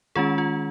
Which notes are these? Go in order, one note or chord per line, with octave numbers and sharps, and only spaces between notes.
D#3 G#3 C#4 F4 G#4
F4